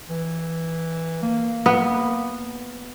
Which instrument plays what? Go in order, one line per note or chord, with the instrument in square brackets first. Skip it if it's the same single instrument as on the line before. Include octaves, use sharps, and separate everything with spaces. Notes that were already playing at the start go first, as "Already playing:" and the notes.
[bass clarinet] E3
A#3
[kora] B3